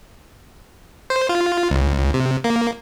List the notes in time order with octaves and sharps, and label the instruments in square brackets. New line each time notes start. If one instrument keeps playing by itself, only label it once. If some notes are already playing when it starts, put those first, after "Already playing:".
[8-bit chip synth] C5
F4
C#2
C3
A#3